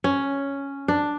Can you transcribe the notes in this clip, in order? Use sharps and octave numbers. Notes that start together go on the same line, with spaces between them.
C#4
D4